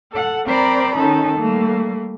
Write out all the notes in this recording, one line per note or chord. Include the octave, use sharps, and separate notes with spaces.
A4 F#5
C4 A#4 C5 D5 A#5 B5
D#3 C#4 D#4 A4
G3 A3 A#3